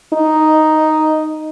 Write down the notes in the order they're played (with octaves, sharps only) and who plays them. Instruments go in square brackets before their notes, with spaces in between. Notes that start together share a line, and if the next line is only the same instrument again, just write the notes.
[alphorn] D#4